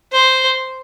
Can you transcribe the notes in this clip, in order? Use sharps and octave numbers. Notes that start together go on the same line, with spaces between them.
C5